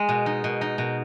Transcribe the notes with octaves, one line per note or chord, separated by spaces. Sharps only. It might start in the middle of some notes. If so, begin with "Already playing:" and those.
Already playing: G#3
B2
D#4
B2
D#4
B2